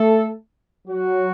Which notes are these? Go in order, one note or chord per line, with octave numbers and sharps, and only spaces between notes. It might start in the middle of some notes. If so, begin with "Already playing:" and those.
Already playing: A3 A4
F#3 F#4